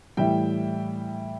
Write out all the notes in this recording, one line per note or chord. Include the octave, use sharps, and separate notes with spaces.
A2 E3 G3 E5 G5